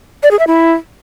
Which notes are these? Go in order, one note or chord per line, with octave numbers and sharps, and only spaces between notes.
D5
G#4
E5
E4